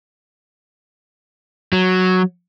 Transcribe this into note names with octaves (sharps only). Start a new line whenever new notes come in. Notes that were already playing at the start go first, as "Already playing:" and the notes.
F#3